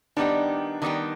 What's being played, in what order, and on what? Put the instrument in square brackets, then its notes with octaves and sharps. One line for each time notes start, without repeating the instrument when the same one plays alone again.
[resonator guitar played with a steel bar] D#3 G3 B3 D#4 G4 [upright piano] D4
[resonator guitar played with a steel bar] D#3 G3 B3 D#4 G4